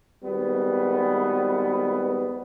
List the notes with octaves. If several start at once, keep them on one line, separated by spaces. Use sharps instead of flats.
G#1 G3 B3